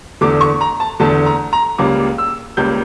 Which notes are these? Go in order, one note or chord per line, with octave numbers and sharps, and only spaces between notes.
E2 D3 A3 D6
C#6
A#5
A5
E2 D3 A3 A5
A#5
A#5
C#2 C#3 G3 A#3 D6
E6
C#2 C#3 G3 A#3 G6